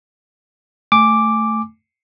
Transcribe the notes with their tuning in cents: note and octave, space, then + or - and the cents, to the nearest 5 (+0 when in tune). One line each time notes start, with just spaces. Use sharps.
A3 +0 G#5 +0 D6 +0